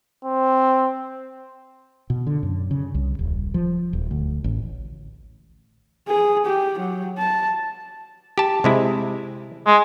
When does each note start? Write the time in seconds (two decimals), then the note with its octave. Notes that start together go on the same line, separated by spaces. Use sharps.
0.25 C4
2.10 B2
2.27 D3
2.43 F#2
2.71 C#3
2.95 C2
3.19 D#1
3.54 F3
3.93 D#1
4.11 D2
4.44 A1
6.08 G#4
6.45 G4
6.79 F#3
7.18 A5
8.38 G4 A5
8.64 C3 G#3 E4
9.67 G#3